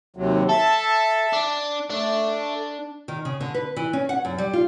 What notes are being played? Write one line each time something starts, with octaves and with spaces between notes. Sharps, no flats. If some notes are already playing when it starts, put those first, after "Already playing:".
D#2 C3 F#3
A4 E5 A5
D4
A3 D4
D#3
C#3
D3
B4
E3
C#4
F#5
F#2
G3
F4